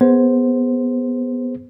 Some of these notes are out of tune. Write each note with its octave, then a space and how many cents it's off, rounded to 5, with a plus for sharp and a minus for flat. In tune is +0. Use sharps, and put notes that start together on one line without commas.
B3 +0 G#4 +0 C5 +0